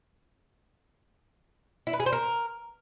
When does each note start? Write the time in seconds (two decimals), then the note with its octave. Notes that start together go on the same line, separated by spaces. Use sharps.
1.87 E4
1.93 B4
2.00 G#4
2.06 C5
2.13 A#4